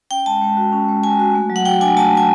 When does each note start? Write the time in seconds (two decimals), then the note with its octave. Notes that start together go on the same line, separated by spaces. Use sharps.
0.11 C#4 G5
0.26 G#3 A5
0.42 G#3
0.57 F#4
0.73 C#4
0.88 G#3
1.04 G#3 G#5
1.19 F#4
1.35 A3
1.50 F#3
1.56 F#5
1.65 F#4 G5
1.81 D4 G#5
1.96 A3 A5
2.12 F#3
2.17 G#5